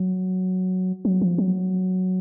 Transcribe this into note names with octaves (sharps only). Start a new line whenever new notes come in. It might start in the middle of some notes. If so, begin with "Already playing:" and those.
Already playing: F#3
F#3
F3
F#3